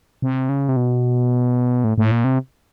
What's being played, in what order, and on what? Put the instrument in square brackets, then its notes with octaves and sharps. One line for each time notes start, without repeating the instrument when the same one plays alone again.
[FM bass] C3
C#3
C3
B2
A2
A2
A#2
C3